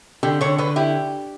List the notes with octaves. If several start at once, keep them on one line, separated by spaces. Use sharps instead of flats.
D3 G4
D3 C#5
D3 B4
E4 G4